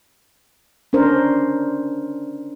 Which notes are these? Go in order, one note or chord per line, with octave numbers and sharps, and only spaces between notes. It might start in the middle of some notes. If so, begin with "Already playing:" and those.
C#4 D4 A#4 C5